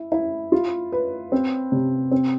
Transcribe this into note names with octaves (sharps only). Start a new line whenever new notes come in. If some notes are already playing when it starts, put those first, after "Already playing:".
Already playing: E4
E4
F4
B4
C4
C3
C4